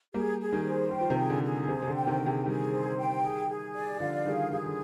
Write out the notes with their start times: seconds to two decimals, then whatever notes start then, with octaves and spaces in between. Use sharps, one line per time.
0.14 G3 A#3 G#4
0.40 G#4
0.52 D#3 G3
0.65 C5
0.91 D#3 G5
1.01 F3
1.10 C3 D#3
1.17 G#4
1.30 D3
1.43 G#4
1.68 C3 C5
1.82 C3
1.88 D3
1.94 G5
2.07 C3 D#3
2.20 G#4
2.26 C3
2.46 D#3 G3 G#4
2.71 C5
2.97 G5
3.22 G#4
3.49 G#4
3.74 D5
4.00 D3 F3 F5
4.25 D#3 G3 G#4
4.51 D#3 G3 G#4
4.66 D3